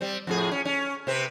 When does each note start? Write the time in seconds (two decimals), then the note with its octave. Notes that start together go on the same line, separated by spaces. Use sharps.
0.01 G3 C4
0.27 F2 A2 G#4
0.52 C#4
0.65 C#4
1.07 C3 C4 B4